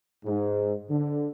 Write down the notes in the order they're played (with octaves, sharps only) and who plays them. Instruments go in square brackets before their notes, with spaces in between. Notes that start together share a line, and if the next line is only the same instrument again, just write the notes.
[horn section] G#2
D3